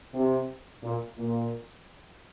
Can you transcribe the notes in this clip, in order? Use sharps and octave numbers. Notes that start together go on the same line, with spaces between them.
C3
A#2
A#2